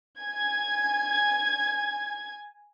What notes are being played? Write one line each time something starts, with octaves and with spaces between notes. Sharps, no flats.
G#5 G#6